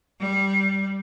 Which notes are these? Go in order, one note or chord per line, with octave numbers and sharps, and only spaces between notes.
G3